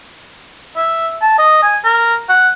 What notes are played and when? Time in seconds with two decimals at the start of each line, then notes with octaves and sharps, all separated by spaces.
0.77 E5
1.22 A5
1.38 D#5
1.63 G#5
1.85 A#4
2.29 F#5